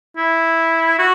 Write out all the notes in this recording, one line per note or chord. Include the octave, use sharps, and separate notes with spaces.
E4
F#4